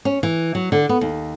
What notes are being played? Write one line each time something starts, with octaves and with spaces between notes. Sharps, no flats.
C#4
E3
F#3
D3
B3
D#2